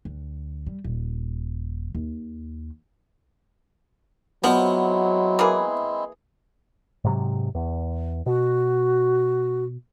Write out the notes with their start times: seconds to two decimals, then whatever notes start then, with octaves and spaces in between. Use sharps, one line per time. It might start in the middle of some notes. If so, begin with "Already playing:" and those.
0.05 D2
0.67 G3
0.84 D#1
1.95 D#2
4.44 F3 F#3 G#3 B3 C4 E4
5.39 E3 A#3 G#4
7.04 G#2 C3 F#3
7.55 E2
8.26 B2 F#4